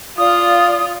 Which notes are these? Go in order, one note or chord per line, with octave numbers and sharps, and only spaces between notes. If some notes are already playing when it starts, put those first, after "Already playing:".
F4 D5 F5 D#6